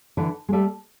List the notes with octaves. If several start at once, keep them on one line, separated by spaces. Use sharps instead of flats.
D3 E3
G#3
G3 A3